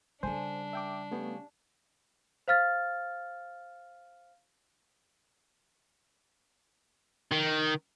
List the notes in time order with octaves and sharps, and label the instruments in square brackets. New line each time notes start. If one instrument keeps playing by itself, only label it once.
[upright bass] C#3 G3 [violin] D4 [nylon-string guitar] A4 G#5 [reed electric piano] C5
[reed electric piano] E5 G5 D6
[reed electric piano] A3 B3 [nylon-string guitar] C#4 G4 F5
[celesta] C5 F5 F6 A6
[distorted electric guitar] D#3